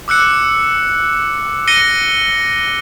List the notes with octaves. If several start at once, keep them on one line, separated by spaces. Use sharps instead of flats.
D6 E6 F#6 C#7
A#6 C#7 D#7 G7